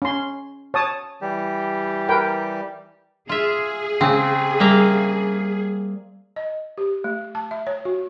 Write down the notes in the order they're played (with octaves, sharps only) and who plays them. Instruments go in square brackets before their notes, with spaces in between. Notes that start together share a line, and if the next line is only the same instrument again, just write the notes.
[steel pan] C#4 C6
C#5 A5 D#6
[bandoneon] E3 G3 G4
[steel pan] A#4 B4 G5
[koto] F4 E5 [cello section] G#4
[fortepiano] C#3 [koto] C4
[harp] G3 [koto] A#3 E5 A#5
[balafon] D#5
G4
A3
A5
E5
C#5
F#4